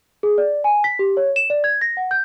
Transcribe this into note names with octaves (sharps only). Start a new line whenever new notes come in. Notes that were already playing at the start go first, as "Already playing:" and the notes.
G#4
D5
G#5
B6
G4
C#5
E7
D5
G#6
A#6
F#5
G6